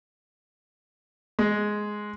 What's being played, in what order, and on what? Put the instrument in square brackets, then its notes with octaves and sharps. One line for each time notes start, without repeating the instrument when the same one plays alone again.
[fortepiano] G#3